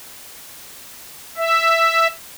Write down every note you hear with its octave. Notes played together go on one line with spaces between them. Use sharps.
E5